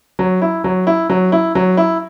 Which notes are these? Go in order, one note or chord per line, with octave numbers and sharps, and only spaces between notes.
F#3
E4
F#3
E4
F#3
E4
F#3
E4